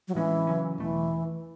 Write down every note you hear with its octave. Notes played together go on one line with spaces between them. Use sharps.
F#3
A2 E3 G#3 C#4
C#3 F#3 C#4
E2 B2 E3 A3